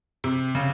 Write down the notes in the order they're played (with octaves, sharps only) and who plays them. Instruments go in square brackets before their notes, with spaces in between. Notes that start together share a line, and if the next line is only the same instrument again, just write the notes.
[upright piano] C3
C#3